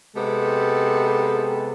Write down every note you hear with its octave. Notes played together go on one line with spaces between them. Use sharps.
C3 G#3 B3 G4 A4